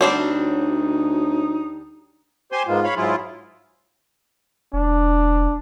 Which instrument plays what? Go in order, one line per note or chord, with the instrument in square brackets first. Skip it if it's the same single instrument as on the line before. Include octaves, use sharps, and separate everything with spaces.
[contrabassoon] D2 [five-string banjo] G3 C4 D4 [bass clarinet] D#4 [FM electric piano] F#4 C#5
[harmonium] G4 [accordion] C5 G#5 C6
[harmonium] G#2 F4 [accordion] G#3 A#3 B3
[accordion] C#5 F5 B5
[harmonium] G#2 F#3 G#4 [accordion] E4 F4
[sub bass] E1 [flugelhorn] D4